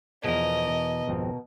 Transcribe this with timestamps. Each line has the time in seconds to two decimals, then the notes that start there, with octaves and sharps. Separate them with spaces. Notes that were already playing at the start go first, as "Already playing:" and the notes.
0.24 E2 B2 F3 G#4 A#4 D#5
0.68 E2
1.07 G#1 F2 C4